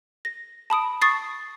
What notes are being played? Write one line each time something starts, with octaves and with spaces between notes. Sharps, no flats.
A#6
A5 B5 D#6 D7
C#6 D#6 A6 C7